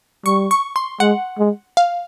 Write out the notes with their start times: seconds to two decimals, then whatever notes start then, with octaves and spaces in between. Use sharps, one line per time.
0.25 G3 C#6
0.51 C#6
0.76 C6
1.00 G#3 F#5
1.39 G#3
1.77 F5